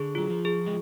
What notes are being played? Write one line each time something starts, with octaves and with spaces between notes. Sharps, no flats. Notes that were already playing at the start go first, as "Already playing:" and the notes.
Already playing: D3 G#4
F#3 F4
F3
G#4
G#3